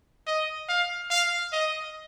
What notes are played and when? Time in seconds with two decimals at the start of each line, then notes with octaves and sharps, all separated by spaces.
0.27 D#5
0.69 F5
1.10 F5
1.53 D#5